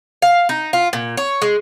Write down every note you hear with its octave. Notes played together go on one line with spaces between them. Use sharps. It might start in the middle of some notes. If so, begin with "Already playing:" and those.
F5
D#4
F4
A#2
C#5
G#3